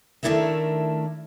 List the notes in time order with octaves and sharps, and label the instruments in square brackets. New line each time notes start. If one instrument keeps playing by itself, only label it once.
[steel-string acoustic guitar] D#3 A3 D4 E4 A#4 E5